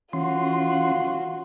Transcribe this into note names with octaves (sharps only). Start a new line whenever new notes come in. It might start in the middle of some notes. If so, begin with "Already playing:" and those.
E3 C#4 F4 F#4 C6